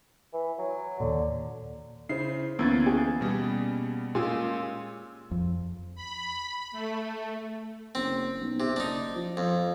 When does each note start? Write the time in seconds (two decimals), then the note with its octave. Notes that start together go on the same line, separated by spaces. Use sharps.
0.33 E3
0.59 F#3
1.00 D#2 A#2 D3
2.09 C#3 E4 C5 C7
2.59 D2 E3 A#3 B3 C#4 E6 G#6 A6
2.86 G#4
3.21 B2 G3
4.15 A#2 G#3 C#4 F4 G#4 C6 E6
5.31 F2
5.95 B5
6.72 A3
7.95 F#1 C4
8.41 B1
8.60 C3
8.76 F#1 D4 D#4
9.16 F3
9.37 F2